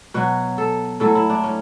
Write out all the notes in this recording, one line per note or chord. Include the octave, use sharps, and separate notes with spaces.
B2 F#3 F#4
A4
A2 F#3 A4
E4
D4
C#4